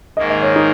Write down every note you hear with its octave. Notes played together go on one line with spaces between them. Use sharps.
G#2 D#3 A#3 D#5
D#5
C#5
D#4